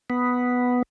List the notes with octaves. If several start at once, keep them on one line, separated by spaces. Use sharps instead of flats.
B3